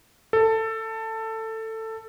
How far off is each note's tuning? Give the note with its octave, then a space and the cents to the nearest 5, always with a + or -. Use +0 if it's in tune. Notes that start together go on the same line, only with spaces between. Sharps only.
A4 +15